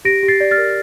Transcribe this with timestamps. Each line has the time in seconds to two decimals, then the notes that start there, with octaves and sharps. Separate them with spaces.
0.05 G4 A#6 D7
0.23 G4
0.28 A6 C7
0.40 D5
0.51 F6 A6
0.58 A#4